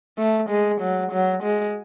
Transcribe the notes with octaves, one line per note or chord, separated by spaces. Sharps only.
A3
G#3
F#3
F#3
G#3